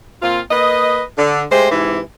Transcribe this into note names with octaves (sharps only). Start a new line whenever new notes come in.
A#2 C4 F4
A#3 B4 D#5
D3
G#3 A3 G4 C5
G#2 C3 E3